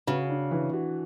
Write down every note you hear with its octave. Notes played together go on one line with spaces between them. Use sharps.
C#3 F#4
D4
E3
F#4